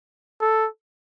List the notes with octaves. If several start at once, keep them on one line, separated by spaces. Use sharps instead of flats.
A4